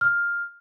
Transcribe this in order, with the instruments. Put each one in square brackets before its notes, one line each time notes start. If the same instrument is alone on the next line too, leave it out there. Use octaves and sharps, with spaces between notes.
[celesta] F6